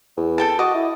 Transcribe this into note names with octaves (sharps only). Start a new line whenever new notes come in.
E2
A4 G5 A5
F#4 D#5 D6
E4